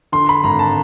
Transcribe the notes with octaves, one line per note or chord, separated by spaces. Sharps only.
D3 C6
B5
G#1 A#5
A5